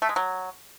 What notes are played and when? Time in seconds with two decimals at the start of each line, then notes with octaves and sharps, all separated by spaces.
0.02 A3
0.09 G#3
0.16 F#3